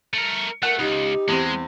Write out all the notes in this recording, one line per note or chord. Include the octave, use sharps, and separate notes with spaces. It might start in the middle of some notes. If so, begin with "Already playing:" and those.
A3 A#4
A3 A#4 F#5
C#2 D#4 G4
E2 G#3 C4